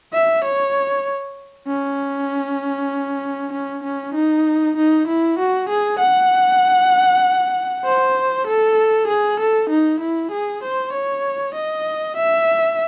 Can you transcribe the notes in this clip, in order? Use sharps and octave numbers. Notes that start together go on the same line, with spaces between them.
E5
C#5
C#4
C#4
C#4
D#4
D#4
E4
F#4
G#4
F#5
C5
A4
G#4
A4
D#4
E4
G#4
C5
C#5
D#5
E5